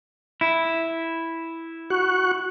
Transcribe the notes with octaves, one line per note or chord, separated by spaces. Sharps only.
E4
F#4 C#6 F#6